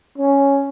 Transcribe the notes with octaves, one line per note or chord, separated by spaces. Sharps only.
C#4